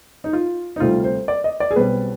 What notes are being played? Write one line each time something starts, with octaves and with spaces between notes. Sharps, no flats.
D#4
F4
D#4
D2 C3 G3 C4 F4
C5
D5
D#5
D5
G#4
B1 B2 G3 C4 B4